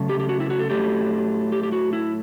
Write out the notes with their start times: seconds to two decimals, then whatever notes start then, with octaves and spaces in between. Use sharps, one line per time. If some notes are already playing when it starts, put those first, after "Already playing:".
Already playing: C#3 F#3 A3
0.09 G4
0.20 G4
0.29 F#4
0.40 E4
0.50 F#4
0.59 A4
0.70 A2 F#3 A3 G4
1.52 G4
1.63 G4
1.72 F#4
1.93 E4